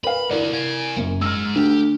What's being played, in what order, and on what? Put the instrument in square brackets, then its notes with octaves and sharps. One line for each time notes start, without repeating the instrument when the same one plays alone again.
[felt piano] A#4 B4 F5 [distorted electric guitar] B5
[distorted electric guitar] A3 F#5 [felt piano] E4 A#4 D5
[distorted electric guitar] F5 G#5
[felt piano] F#1 F#2
[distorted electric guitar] G#3 D#4 [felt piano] E6 F6
[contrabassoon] D2 [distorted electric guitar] G4